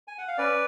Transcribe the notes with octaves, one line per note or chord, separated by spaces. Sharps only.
G#5
F#5
F5
C#4 B4 D5